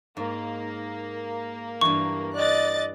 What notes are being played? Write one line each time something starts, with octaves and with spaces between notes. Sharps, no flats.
G#2 A#3
G2 E3 C#6
D5 D#5 F#6 A6